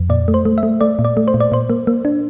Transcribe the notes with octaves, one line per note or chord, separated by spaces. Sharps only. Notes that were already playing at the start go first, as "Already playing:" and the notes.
Already playing: F2
A#2 D5
A3
C5
A3
E5
A3
A3 D5
A#2
D5
A3
C5
A#2
D5
A#2 C5
A#3
A#3
D4